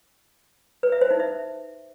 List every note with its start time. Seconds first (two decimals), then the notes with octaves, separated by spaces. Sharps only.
0.83 B4
0.92 E5
1.01 C5
1.11 D#4
1.20 E5